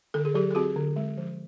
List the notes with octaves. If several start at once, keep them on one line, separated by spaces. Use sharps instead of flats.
D3 A4
G#4
F#3 G4 A4
A4
C4 F#4 G#4
D3
G#3
F3